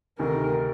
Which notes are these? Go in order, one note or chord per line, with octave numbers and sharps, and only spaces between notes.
D2 C3 D#3 A#4